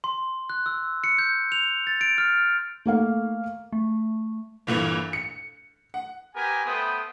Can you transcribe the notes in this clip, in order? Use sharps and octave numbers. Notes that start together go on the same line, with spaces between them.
C6
F#6
E6
C#7
G6
F7
A6
D7
F6
A3 A#3 F5
A3
G1 A#2 E3
C#7
F#5
B3 G4 A#4 G#5
A3 B3 B4 C5 G5 D#6